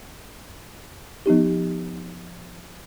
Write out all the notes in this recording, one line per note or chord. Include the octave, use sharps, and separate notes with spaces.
F3 B3 D#4 G4